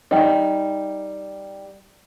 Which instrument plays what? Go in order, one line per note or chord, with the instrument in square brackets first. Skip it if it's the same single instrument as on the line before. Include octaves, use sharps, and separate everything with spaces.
[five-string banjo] G3 D#4